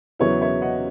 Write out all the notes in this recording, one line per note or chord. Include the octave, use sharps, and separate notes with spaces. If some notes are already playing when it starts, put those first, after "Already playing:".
E2 C#3 F#3 B3 E4 C#5
C#5 E5
D#5 F#5